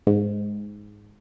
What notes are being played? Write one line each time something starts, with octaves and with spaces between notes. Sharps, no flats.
G#2